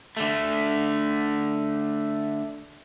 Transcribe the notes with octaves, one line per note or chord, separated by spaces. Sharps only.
D3 A3